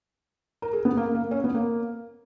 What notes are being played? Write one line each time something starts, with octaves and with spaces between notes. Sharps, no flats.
A#4
G#4
B3
A#3
A#3
C#4
B3
A#3